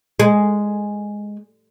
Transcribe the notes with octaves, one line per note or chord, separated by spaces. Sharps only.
G#3